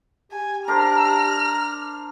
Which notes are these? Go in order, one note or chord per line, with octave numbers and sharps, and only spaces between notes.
G4 G#5
D4 A#4 C5 A#5 F6